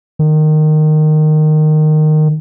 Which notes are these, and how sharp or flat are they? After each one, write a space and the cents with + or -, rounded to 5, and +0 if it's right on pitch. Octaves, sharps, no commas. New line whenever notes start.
D#3 -15